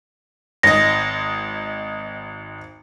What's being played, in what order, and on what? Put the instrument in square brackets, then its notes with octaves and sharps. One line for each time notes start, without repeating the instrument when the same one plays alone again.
[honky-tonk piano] G#1 D#5 [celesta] A#6